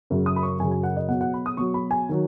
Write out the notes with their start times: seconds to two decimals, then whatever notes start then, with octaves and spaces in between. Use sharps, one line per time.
0.10 F#2 C#3 F#3
0.26 D#6
0.36 B5
0.43 C#6
0.59 F#2 C#3 F#3 G#5
0.71 G#5
0.83 F#5
0.97 D#5
1.08 B2 F#3 F#5
1.21 F#5
1.34 B5
1.46 D#6
1.57 B2 F#3 C#6
1.74 B5
1.91 G#5
2.09 D#3 F#3